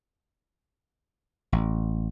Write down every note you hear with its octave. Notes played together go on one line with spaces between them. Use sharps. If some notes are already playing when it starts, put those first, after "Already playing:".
A1